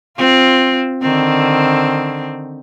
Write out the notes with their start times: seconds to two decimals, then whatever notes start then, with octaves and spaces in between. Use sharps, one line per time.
0.17 C4 F4
1.02 D3 D#3 C4